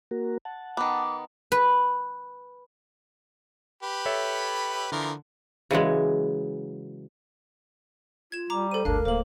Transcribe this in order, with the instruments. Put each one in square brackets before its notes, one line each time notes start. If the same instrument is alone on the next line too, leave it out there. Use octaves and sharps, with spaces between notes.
[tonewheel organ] A#3 F#4 A#4
F#5 A5
[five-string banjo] D#3 B3 [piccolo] D6
[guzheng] B4
[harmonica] G4 B4 B5
[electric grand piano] A4 C#5 E5
[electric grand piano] D3 [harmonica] E3 F3 A#4
[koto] C#3 E3 F#3 G#3
[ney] F4 [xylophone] G#6 E7
[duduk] G3 [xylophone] A#5 D6
[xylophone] A4 D#7 [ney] C5
[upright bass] G1 D2 [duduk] D4 [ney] A#4 [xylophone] F5
[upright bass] D1 [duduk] A#3 [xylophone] C5 F#7